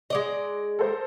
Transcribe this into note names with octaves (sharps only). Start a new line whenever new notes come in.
G#3 D5 D#5
A4 A#4 C5